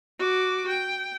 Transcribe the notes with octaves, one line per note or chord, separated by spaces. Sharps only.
F#4 D6
G5